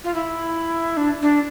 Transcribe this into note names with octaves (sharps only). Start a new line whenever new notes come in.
F4
E4
D4
D4